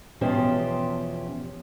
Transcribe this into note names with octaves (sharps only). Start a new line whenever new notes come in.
E2 B2 F3 C#4 G4 C5